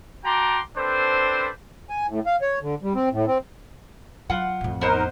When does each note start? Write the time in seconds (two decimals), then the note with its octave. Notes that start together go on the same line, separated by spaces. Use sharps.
0.25 F#4 G5 A5 A#5 C6 D6
0.76 C4 D4 A4 B4 C5
1.89 G#5
2.09 A2
2.26 F5
2.42 C#5
2.62 D3
2.83 G3
2.95 C4
3.12 A2
3.27 C4
4.30 F#3 F4 F#5
4.61 A1 F2
4.81 B3 D#4 A#4 C5 D#5